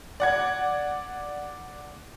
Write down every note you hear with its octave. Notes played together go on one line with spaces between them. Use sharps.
D5 F#5 G#6